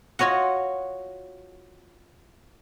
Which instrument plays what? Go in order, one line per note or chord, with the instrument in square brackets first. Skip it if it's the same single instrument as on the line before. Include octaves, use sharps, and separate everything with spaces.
[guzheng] F4 F#4 C#5 D#5 F#5